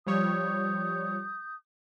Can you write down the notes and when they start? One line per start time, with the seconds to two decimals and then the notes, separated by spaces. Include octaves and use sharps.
0.06 F3 G3 C#5 D#6 G6